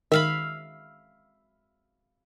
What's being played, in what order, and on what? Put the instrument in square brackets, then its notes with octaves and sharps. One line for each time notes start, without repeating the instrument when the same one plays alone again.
[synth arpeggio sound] D#3 [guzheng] E5 F5 B5